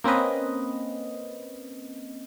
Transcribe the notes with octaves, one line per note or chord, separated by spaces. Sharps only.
A#3 C4 C#4 B4 D#5